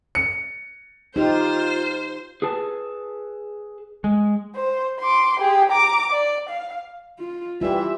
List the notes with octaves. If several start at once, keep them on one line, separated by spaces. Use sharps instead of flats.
C#7
D#4 F4 G4 C5
G#4 B4 A5
G#3
C5
C6 D6
G4 G#4
A#5 D6
D5
F5
F4
E3 G3 F4 G4 E5